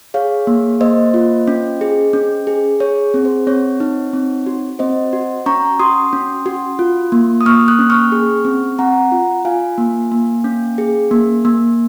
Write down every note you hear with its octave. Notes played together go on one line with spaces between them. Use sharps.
G#4 C#5 F5
A#3
A#3 C5 D#5
F4
C#4
G#4
C#4
G#4
G#4 C#5
C4
C5
C4 C#5
D#4
C4
F#4
C4 C5 D#5
F#4
C#4 A#5 C#6
F#4 C6 D#6
C#4
F#4
F4
A#3
D#6
A#3 C#6 F6
D#6 F#6
C#4
C#6 F6
G#4
C4
C4 F#5 A#5
F4
F4 F5 G#5
A#3
A#3
C#4
G#4
A#3
A#3